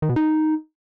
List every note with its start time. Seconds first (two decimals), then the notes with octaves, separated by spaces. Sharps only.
0.02 D#3
0.09 B2
0.16 D#4